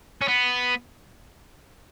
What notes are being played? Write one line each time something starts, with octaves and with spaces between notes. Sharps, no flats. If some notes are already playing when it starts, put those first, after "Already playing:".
C#4
B3